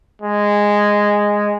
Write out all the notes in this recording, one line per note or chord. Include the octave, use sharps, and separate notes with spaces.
G#3